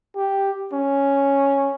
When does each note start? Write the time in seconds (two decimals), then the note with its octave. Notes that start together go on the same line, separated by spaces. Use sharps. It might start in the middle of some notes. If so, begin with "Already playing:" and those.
0.16 G4
0.73 C#4